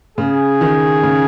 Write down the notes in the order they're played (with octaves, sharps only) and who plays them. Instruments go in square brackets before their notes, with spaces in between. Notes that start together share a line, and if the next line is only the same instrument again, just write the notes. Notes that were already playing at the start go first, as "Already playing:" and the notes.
[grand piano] C#3 [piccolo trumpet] G#4
[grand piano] D#3
C#3